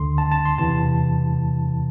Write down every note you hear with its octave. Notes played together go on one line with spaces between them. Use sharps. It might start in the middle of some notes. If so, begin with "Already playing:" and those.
Already playing: D2 D3 C6
A5
A5
C6
E2 C3 E3 A5